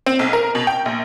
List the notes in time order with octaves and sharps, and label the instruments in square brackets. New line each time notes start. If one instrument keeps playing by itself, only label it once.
[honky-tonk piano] C4
B1
A#4
B2
G5
A#1